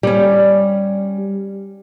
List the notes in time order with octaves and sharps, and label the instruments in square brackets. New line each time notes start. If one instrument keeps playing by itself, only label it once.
[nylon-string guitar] G3 C#4